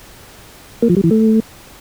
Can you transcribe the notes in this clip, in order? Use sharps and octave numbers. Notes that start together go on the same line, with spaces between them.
A#3
F3
G3
E3
A3